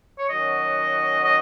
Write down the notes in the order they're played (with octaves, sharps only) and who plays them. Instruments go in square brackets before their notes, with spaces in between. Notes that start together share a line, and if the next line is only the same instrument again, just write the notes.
[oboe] C#5
[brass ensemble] D#3 F#3 C#4 F#4 [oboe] D#5
[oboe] D#5